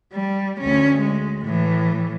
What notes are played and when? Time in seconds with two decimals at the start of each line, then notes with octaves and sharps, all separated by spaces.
0.13 G3
0.60 D2 C#4
1.00 G#3
1.42 A2 E3